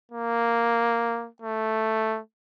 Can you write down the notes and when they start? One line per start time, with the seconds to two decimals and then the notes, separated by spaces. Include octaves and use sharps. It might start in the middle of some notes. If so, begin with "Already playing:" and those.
0.12 A#3
1.42 A3